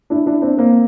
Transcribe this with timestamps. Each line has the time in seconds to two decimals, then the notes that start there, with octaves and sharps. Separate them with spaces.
0.10 D4 E4
0.26 D4 E4
0.42 C4 D4
0.57 A#3 C4